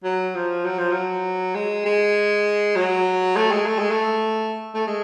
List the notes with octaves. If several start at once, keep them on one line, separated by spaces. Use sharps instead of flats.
F#3
F3
F#3
F3
F#3
G#3
G#3
F#3
A3
G#3
A3
G#3
A3
A3
G#3